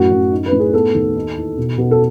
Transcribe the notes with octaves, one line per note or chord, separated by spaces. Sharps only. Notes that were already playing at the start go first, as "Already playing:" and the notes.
Already playing: F#2 A2 F#4
F#2
D#4
B4
A2
G#4
B3 A4
D#2
D#4
E2
B2
B2
A4